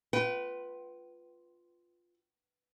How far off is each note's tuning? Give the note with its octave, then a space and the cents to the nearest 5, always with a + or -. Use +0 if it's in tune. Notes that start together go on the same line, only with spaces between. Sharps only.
F4 +0 B4 +0 G5 -40